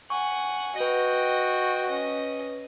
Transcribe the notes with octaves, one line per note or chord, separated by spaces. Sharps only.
F#5 G#5 C#6
F#4 B4 D#5 G5 A#6
C#4 D#5